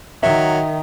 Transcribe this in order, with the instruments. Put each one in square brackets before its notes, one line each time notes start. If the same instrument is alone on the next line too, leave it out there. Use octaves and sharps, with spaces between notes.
[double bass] D#3 [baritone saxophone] F#3 [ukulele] E5